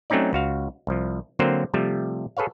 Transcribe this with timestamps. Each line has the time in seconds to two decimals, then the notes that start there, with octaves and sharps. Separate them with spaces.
0.10 F#3 A3 C4 C#4 D#4 D5
0.33 C#2 F#4 F5
0.87 C2 F3
1.39 D3 F#3 A#3 C4 A#4 C5
1.74 C3 F3 G3 A3
2.37 G#4 A4 B4 C#5 F5